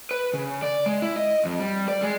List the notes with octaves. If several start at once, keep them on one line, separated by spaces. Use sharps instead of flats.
B4
C#3
D5
G#3
E4
D#5
F2
G3
D5
G#3